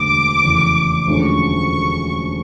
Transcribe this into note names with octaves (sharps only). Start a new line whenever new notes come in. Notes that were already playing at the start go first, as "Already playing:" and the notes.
Already playing: E1 D2 D3 D6
F1 E2 C#3 E3
E1 D2 D3 F3 C#4 C#6